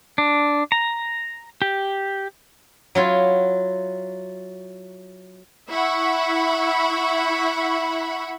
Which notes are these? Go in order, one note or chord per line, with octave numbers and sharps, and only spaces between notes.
D4
A#5
G4
F#3 E4 F4
E4 E5 F#5 B5 C#6